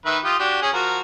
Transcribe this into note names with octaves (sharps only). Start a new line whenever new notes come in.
D#3 B4 E5
F4 G4 D#6
D4 F#4 G4
C#4 G#4
F3 F#4 A#4